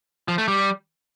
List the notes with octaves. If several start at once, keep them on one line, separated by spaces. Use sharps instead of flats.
F3
A3
G3